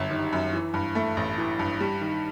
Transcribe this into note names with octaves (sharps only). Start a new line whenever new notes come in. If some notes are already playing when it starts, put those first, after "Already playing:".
Already playing: G1 F#2 G3
D#3
F#2
E3
G2
A3
A1
E3
G2
G3
D#3